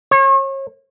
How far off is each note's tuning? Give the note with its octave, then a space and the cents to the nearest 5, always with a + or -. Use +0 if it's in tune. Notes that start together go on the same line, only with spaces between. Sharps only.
C#5 -35